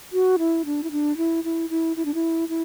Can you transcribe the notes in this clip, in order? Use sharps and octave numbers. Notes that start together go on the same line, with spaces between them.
F#4
E4
D4
E4
D4
E4
E4
E4
E4
D4
E4
E4